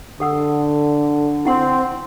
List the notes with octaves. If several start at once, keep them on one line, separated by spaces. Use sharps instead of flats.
D3 A4 F#5 E6
C4 E4 F#5 C6